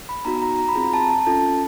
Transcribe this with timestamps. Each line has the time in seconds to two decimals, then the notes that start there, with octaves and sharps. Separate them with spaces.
0.09 B5
0.25 B3 D#4 F#4 A#5
0.42 A#5
0.59 A#5
0.69 B5
0.75 C4 F4 G#4 A#5
0.94 A5
1.10 A5
1.26 C#4 F4 A4 A5